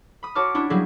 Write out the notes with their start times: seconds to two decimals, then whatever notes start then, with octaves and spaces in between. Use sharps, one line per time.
0.23 B5 D#6
0.35 F#4 C#5 A5 D6 F6
0.55 C#4 D4 E4
0.70 F#3 G3 A#3 E4 G#4